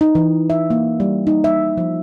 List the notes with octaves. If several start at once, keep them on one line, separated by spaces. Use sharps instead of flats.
D#4
E3
E5
A#3
G3
D#4
E5
F3